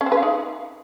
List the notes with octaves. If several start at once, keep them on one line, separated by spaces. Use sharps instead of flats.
C#4
C4
B4
F5
D#4